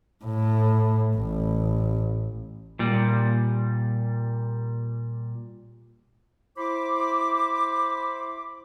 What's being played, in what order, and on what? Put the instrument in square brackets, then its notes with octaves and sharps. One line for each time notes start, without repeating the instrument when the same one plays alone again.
[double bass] A2
A1
[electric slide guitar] A#2 G3
[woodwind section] E4 C5 B5 C6 D6